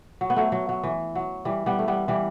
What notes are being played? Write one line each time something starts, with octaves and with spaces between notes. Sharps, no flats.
F#3
B3
F#3 A3
F#3
F#3
E3
F#3
E3 G3
G3 B3
A3
G3 B3
E3 G3